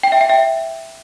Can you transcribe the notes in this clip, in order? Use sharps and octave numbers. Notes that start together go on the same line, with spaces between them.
G5
E5
G5
E5